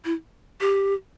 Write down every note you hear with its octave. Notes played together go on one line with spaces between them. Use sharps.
E4
G4